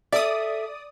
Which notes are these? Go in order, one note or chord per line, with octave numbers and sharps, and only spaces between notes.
A4 D5 E5 D#6